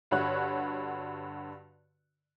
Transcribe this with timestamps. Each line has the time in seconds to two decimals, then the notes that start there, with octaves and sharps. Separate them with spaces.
0.11 G2 D3 F#4 C#5 F#6